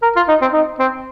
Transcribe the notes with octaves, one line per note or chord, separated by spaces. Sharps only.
A#4
F4
D#4
C4
D#4
C4